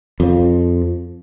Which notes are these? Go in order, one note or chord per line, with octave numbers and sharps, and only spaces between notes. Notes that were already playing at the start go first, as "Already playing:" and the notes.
F2 F3